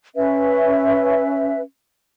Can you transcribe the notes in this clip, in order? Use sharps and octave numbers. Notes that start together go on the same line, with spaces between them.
C#4 B4 E5